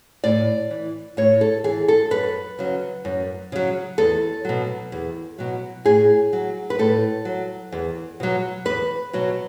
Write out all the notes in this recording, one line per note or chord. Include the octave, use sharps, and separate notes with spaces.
A2 D5
E3
A2 C#5
A4
E3 G#4
A4
F#2 B4
C#3 F#3
F#2
C#3 F#3
E2 A4
B2 F#3
E2
B2 F#3
A2 G#4
F#3
B4
A2 A4
F#3
E2
B2 F#3
E2 B4
B2 F#3